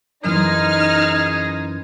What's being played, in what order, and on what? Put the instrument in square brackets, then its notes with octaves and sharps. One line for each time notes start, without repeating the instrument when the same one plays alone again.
[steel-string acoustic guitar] F#2 E3 C5 [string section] D#4 [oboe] G#4 [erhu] F6